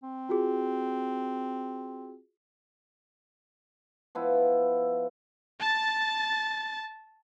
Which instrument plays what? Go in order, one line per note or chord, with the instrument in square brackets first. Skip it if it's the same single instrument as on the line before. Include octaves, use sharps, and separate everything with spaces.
[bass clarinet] C4
[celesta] F4 F#4 G#4
[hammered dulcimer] F3 B3 E4
[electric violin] A5 A6